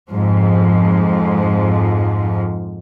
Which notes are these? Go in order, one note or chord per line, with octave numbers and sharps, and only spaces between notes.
F2 G#2 F3